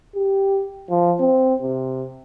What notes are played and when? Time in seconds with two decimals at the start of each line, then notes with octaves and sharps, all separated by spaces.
0.16 G4
0.90 F3
1.20 C4
1.62 C3